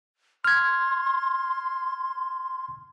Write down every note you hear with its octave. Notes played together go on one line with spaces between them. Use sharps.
C6 F6 G#6